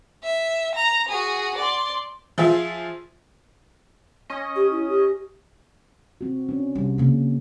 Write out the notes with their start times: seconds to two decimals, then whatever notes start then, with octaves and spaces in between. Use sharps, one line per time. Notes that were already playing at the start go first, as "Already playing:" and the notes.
0.23 E5
0.75 A#5
1.09 F#4 G#4
1.58 D5 C6
2.38 F3 F4 G#4 E5
4.30 C#4 D#5
4.56 G4
4.72 E4
4.89 G4
6.21 C4 F#4
6.49 C#4 D4
6.75 C2
6.98 C#3 A#3